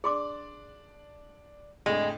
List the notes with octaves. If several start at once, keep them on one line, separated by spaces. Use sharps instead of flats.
D4 G#4 D5 C6 D6
F2 A2 D3 G#3